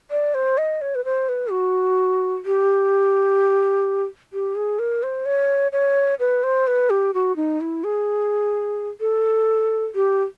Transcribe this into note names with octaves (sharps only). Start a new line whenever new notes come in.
D5
C5
D#5
C#5
B4
C5
B4
F#4
G4
G4
G#4
A#4
C5
C#5
C#5
B4
C5
B4
G4
F#4
D#4
E4
G#4
A4
G4